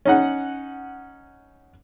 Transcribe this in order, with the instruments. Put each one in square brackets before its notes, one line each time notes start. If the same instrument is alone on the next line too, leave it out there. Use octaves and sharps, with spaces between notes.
[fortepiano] C#4 D#4 F#5